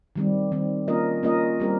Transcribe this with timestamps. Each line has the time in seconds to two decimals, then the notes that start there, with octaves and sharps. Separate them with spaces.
0.16 D#3 G3 C4
0.52 D#3 G3 C4
0.88 A#3 C#4 F4 A#4 D#5
1.23 A#3 C#4 F4 A#4 D#5
1.60 G3 C4 G4 A#4